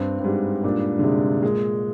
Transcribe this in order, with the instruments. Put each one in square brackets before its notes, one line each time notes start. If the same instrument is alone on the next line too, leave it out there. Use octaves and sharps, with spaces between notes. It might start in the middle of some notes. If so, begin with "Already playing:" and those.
Already playing: [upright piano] G2 [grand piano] C4
[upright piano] G2
[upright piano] G#2 [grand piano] G3
[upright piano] A#2 [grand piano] D4
[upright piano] D3
[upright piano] C3 [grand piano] G#3
[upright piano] A#2 [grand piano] G#3